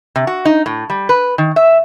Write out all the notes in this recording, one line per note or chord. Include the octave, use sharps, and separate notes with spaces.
C3
F#4
D#4
A2
G3
B4
D#3
E5